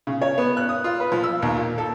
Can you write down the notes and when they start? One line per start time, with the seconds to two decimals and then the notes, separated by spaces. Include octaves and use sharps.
0.07 C#3
0.22 C#5
0.38 B3
0.57 F#6
0.69 D#6
0.84 F4
1.00 B4
1.12 F3
1.23 E6
1.42 D#2
1.57 A#2
1.78 A4